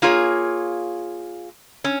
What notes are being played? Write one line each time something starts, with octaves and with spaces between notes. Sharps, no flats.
A#3 F4 G#4 C#5
C#4